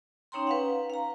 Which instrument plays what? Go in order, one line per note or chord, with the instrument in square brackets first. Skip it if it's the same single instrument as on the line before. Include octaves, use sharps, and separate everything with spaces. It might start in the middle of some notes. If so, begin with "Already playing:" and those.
[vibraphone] C#4 D#4 C#5 G5 A#5 C6
B4 F5 F#5
F5 A#5